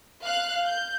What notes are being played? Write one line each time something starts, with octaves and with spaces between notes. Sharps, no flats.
F5 F#6
G6